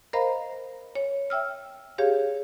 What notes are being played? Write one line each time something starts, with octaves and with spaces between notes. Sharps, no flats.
A#4 C5 D#5 F5 A#5 B5
C#5
E5 G5 E6 F6
G4 G#4 C#5 F5